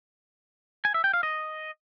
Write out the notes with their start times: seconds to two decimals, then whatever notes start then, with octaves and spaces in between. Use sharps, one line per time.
0.85 G#5
0.94 E5
1.04 G5
1.14 F5
1.23 D#5